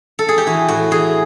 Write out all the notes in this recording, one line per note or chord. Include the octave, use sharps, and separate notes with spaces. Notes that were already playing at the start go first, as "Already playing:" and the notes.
A4
G#4
G4
E3 F#4
A2 F#4
E3 G#4